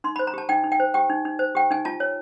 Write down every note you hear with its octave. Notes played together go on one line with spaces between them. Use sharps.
D#4 C6
B5
C5
A#5
G4 A5
D#4 G5
D#4
G5
C5
G4 G5
D#4
D#4
C5
G4 G5
D#4 G#5
F4 A5
C#5